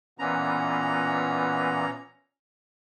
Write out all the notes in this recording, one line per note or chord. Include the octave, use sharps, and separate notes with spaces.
A#2 E3 B3 C#4 A#5